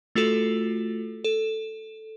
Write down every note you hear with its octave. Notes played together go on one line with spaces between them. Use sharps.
A3 F4 F#4 A4
A4